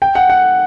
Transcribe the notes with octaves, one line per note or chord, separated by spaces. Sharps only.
G5
F#5
F#5